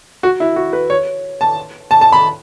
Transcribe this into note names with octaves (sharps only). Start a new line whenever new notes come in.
F#4
E4
F#4
B4
C#5
A5
A5
A5
B5